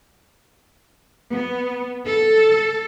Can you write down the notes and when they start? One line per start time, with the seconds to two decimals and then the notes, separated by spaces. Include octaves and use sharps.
1.32 B3
2.08 A4